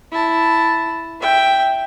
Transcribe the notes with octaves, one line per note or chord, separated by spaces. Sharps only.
E4 A5
E5 G5